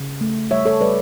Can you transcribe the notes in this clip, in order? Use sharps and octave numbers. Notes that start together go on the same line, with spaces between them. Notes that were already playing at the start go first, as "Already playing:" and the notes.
Already playing: C#3
A3
G3 C#5 E5
A4 C#5
G3 B4 D5